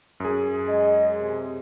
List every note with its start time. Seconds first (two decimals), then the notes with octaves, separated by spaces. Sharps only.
0.20 F#2 G#4
0.68 G#3 D#5
1.19 C3